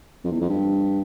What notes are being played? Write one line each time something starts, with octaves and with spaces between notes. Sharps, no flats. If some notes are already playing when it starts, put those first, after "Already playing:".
F2
E2
F2
G2